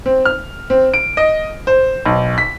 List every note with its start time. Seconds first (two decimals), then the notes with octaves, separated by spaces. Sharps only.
0.06 C4
0.25 F6
0.70 C4
0.94 D7
1.17 D#5
1.67 C5
2.06 B1
2.38 B6